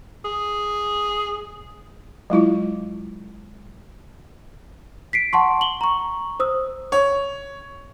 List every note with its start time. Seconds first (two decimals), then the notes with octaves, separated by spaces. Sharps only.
0.25 G#4
2.30 F#3 G#3 E4 F4
5.13 B6 C7 D7
5.33 F#5 A5 C6 C#6
5.61 F#7 G7
5.81 A#5 C#6
6.40 C5 D#6 E6
6.92 C#5